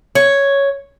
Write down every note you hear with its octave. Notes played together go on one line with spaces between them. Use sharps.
C#5